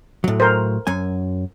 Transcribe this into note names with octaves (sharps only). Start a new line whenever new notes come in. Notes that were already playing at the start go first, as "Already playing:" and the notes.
A2 F#3
A#4 C5
F#2 F#3 G#5